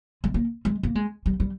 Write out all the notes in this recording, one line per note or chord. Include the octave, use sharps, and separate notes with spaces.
G#3
A#3
G#3
A#3
G#3
G3
G3